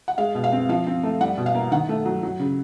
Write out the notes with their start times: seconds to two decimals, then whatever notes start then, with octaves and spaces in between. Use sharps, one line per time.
0.08 F#5
0.18 G#3 F5
0.35 B2
0.44 F5
0.52 C4
0.69 F3 F5
0.87 C4
1.03 A3
1.21 G3 F#5
1.38 B2
1.46 F5
1.55 A#3
1.72 D#3 F#5
1.89 A3
2.06 F#3
2.23 F#3
2.40 C#3